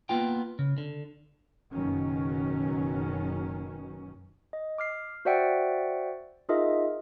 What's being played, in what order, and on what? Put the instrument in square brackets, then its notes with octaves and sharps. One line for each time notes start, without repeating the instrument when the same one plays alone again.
[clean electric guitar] A#3 B3 F4 G5
C#3
D3
[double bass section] F#1 B2 D#3 F#3 C#4
[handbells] D#5
D6 F6 C7
F#4 C5 D5 E5 F#5 G5
D#4 F4 G#4 A#4 D#5 E5